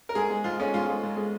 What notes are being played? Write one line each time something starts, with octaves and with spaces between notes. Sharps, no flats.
A#4
G#2 G#4
G#3
G#2 F4
G#3 C#4
G#2 F4
G#3
G#2
G#3